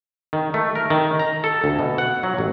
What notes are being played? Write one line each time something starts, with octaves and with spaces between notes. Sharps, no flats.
D#3
A3
A#4
D#3
A#5
A4
D2
B2
F#5
F#3
A1